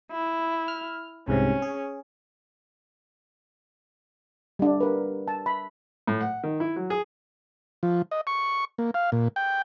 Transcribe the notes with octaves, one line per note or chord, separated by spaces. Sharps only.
E4
F6
C2 G#2 C3 C#4
G#4
G3 D4
A#4 B4
A5
B5
A2
F#5
D#3
E4
F#3
G#4
F3
D#5
C#6
A#3
F5
A#2
G5